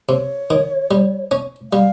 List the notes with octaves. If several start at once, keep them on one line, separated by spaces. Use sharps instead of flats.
C3 C#5
D#3
G3
C#4
G3 F5